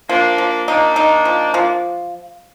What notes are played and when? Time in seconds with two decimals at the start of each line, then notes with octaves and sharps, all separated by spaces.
0.09 F3 A#3 D4
0.38 F3
0.68 A#3 D4 D#4
0.96 D#4
1.25 F3
1.54 F3